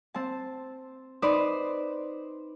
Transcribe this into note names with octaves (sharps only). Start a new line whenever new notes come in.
C4 A5
D#4 B4 C5 D5